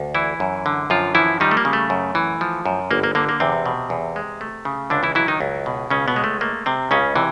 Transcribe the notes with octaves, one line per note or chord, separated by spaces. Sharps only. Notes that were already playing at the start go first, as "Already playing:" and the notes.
Already playing: D2
E3 E4
F#2
D3
F#2 F3 F4
E3 F3 E4
D#3 G3 D#4
A3
A#3
C#3
A3
F#2
E3
F3
F#2
G1 A#3
A#3
D3 A#3
A#3
E2 C3 C4
B2
E2
G#3
A3
C#3
C#2 D3 D4
E3 E4
E3 F#3 E4
D#3 D#4
C#2
B2
C#2 C#3 C#4
B2 B3
G#3
A3
A3 A#3
C3 C4
C#2 C#3 C#4
C3 E3